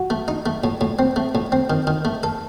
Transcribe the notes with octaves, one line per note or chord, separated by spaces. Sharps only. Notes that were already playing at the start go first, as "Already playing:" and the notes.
Already playing: F#4
A3
D#4
A3
A2
A2
C4
A3
A2
C4
D#3
D#3
A3
A4